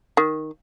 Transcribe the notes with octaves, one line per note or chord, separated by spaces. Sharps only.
D#3